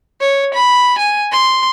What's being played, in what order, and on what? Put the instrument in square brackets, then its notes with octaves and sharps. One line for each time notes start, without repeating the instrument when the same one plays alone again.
[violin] C#5
B5
G#5
C6